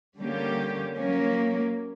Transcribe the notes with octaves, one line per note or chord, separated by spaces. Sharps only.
D3 G3 A#3 C#4 G4
F#3 A#3 C#4